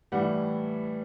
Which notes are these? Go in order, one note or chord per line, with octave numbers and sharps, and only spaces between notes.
A2 E3 G3 F#5